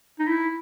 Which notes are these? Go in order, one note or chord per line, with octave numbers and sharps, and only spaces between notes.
D#4
E4